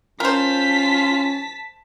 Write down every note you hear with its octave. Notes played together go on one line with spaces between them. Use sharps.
C#4 F4 A#4 C5 A5 B6